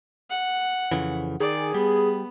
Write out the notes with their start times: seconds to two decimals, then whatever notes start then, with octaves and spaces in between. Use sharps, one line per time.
0.30 F#5
0.91 F2 C#3 E3
1.40 D#3 G#4 D5
1.74 G3 B3